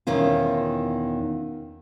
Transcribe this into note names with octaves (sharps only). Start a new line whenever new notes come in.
E2 B2 D#3 C#4 F4